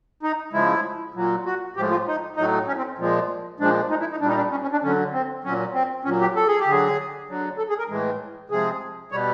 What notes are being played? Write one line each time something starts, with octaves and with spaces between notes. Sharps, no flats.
D#4
C#3 F3 G#3 E4
A#2 F#3
F#4
A2 F3 G#3 G4
F4
D#4
A2 F#3 D#4
C#4
C4
A#2 F3 G#3
A#2 F3 G#3 D4
D#4
E4
D#4
A#2 G3 D4
D#4
D4
C#4
C#4
D4
D3 F#3 C#4
C4
A#2 F#3 C#4
C4
A#2 F#3 C#4
G4
A4
G#4
G4
D3 F#3 G#4
D3 F#3
A4
G#4
A#4
A2 E3 G#3
C3 F3 G#3 G#4
B2 G3 C#5